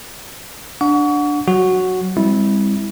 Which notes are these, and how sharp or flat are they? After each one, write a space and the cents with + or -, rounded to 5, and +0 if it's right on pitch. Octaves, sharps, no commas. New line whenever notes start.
D4 +0 F#5 -20 C#6 +35
F#3 +0 F#4 +0
G3 +45 C4 +0 E4 -15